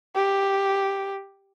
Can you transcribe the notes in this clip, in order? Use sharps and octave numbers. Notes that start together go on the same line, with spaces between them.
G4